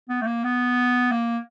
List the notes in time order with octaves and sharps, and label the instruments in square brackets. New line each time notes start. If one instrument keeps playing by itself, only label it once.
[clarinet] B3
A3
A#3
B3
A#3